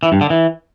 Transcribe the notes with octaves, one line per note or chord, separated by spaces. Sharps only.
E3
G2
D3
E3